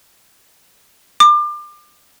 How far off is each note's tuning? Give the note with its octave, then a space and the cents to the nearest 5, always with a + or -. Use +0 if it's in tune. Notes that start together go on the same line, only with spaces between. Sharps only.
D6 +30